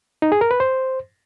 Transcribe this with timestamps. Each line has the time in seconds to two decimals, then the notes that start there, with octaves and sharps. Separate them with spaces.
0.22 D#4
0.32 G#4
0.41 A#4
0.51 B4
0.60 C5